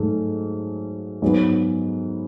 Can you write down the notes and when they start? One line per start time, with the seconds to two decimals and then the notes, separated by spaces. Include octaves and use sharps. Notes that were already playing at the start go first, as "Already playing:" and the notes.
Already playing: G#2 F#3 A3
1.22 G#2 F#3 B3